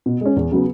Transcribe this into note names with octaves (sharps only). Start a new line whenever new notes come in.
B2
G#3 C#4
E2
C#3 F#3 B3